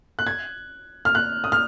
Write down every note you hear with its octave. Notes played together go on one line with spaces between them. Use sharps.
F#6
G#6
F6
F#6
D#6
F6